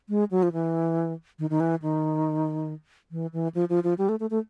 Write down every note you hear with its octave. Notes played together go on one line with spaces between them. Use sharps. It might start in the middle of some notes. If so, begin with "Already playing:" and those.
G#3
F#3
F3
E3
D#3
D#3
E3
D#3
E3
E3
F3
F3
F3
G3
A3
A3
A3